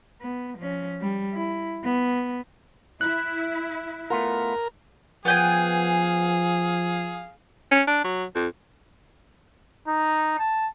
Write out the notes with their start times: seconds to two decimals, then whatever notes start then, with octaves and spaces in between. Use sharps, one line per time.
0.21 B3
0.58 F3 C#4
1.01 G3
1.33 E4
1.84 B3
3.01 E4 F#6
4.10 A3 B3 F4 A#4
5.25 F3 B3 G#4 F5 G5 G#5
7.71 C#4
7.88 D4
8.04 F#3
8.35 F2
9.88 D#4
10.39 A5